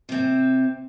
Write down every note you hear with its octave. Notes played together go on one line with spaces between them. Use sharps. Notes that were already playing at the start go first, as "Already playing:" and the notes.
C3 C4